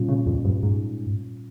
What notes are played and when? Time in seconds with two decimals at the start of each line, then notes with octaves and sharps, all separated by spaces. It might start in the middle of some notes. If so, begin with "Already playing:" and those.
Already playing: A#2 G3 C#4 F4
0.08 C#3
0.26 F2
0.45 G2
0.63 G#2